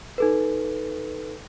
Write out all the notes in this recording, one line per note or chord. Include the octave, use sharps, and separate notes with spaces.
D#4 A4 B4